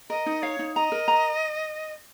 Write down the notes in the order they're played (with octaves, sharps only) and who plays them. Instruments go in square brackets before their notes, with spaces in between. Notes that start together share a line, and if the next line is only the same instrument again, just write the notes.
[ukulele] A#4 [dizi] D#5
[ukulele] D#4
[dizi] C#5 [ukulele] F5
[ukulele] D#4
[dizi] D#5 [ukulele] A#5
[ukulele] A#4
A#5